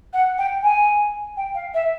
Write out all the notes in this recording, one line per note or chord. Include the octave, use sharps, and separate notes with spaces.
F#5
G5
G#5
G5
F5
E5